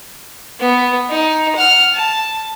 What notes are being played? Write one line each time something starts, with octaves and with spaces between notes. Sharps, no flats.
B3
D#4
F#5 F6
A5